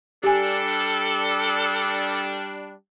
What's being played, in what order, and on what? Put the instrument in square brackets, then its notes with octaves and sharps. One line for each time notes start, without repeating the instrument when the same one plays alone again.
[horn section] G3 D4 [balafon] G4 G#5 [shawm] A4